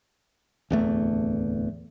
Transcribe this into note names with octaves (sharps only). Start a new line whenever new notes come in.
D1 E2 A3